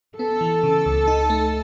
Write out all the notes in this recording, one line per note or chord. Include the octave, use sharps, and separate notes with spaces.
B3 A4
E3
C#3
C#2
D#4
A3